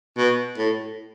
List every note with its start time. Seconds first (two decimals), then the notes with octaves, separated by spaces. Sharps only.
0.18 B2
0.58 A2